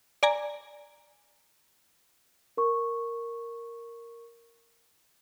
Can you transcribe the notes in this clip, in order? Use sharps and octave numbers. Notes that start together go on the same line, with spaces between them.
D5 G#5 A#5
A#4 C#6